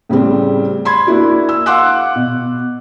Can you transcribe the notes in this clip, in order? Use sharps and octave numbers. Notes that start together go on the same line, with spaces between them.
A2 C#3 G3 C4
B5 C6 G#6
A#3 D4 E4 F#4
E6
F5 F#5 C6 D6 E6 F#6
B2